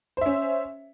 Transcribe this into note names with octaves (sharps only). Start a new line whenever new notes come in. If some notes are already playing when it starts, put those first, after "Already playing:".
C#4 C5 E5